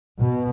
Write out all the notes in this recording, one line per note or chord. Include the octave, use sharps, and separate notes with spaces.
B2